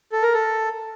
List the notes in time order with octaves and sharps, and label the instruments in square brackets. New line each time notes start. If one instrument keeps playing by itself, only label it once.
[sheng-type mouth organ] A4
A#4
A4